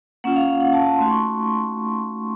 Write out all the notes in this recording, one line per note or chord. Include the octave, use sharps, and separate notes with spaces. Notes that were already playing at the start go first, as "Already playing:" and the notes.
A#3 C#4 F4 F#5
F5
F5
F#5
A5
A5
A3 D#4 F#4 C6
C#6
C6